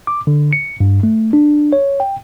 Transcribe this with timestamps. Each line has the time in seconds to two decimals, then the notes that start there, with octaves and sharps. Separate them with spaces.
0.07 D6
0.27 D3
0.53 C#7
0.80 G2
1.03 A3
1.33 D4
1.73 C#5
2.00 G5